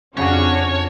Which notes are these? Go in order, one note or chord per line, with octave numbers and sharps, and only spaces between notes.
F2 C#3 C#4 D4 F#4 G#4 C#5